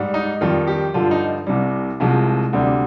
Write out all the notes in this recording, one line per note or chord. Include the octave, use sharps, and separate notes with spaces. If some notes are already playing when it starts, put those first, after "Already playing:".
Already playing: G#2 G3
D#4
F2 D#3 G3 F4
G4
G2 D3 F3 F4
D#4
C2 C3 G3
C2 C3 F3 G#3
D2 C3 G3